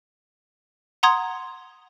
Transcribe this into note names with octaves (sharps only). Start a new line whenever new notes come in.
F#5 A#5 C6 D#6 G#6